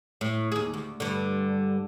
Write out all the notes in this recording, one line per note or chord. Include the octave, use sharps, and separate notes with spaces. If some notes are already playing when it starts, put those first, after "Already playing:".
A2
D#2 G#4
D2
G2 D3